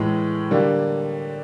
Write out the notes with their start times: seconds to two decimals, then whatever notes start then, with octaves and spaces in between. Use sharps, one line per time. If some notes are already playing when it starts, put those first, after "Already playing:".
Already playing: A2 E3 G#3
0.51 D3 G3 A#3